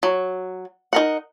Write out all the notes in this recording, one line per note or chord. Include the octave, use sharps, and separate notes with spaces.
F#3
D#4 A#4 F#5